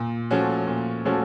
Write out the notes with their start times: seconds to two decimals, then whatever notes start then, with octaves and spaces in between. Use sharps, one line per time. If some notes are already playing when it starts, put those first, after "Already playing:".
Already playing: A#2
0.30 F3 A3 C#4 F#4
0.67 A#2
1.05 F3 A3 C#4 F#4